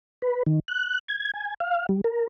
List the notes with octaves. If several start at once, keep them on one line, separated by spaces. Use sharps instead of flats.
B4
D#3
F#6
G#6
G#5
F5
G3
A#4